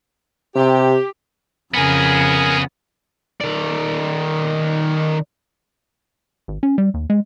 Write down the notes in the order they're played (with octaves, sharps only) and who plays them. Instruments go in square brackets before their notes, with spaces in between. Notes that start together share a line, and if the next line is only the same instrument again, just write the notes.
[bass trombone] C3 [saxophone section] G4
[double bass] F2 C#3 [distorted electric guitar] B3 G#4 [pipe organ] A#4 G#5
[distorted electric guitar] D#3 D5
[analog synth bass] G#1
C#4
G3
D#2
G#3